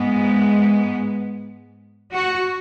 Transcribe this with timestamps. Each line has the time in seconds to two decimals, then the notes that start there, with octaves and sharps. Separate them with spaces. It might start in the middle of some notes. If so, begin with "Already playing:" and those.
Already playing: G#2 G#3 B3
2.14 F#4